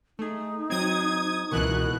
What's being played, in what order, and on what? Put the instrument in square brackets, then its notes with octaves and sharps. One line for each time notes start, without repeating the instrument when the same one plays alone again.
[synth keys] A3 G#4 [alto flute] D#4
[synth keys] F#3 C4 [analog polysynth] D#6 G#6
[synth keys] C#2 E3 C#6 [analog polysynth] B2 F#6 [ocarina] A#4